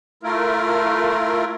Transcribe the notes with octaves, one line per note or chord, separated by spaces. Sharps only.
A3 E4 F4 A#4